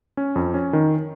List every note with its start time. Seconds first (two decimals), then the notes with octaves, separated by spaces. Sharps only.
0.17 C#4
0.36 F2
0.54 C#4
0.73 D#3